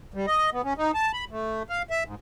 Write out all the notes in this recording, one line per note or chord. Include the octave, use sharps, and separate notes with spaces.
G3
D#5
B3
C#4
D#4
A5
B5
A3
F5
E5
G#2